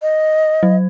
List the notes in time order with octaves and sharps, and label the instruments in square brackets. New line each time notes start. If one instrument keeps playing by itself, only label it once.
[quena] D#5
[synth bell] F#3